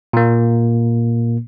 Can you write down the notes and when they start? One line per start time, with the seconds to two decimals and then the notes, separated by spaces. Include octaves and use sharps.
0.13 A#2 A#3